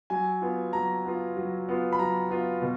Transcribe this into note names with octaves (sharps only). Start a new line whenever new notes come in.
F#3 G#5
B3 F4
F#3 A#5
B3 F4
F#3
B3 F4
B5
F#3 A#5
B3 F4
B2